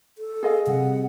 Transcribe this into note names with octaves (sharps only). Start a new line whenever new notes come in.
A4
G#4 D#5 F5
C3 G3 F#5